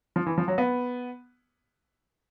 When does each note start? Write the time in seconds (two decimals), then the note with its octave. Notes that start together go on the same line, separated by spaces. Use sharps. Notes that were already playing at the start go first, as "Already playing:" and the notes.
0.16 F3
0.26 E3
0.38 F3
0.48 F#3
0.58 B3